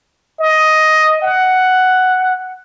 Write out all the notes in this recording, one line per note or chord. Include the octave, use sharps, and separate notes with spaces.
D#5
F#5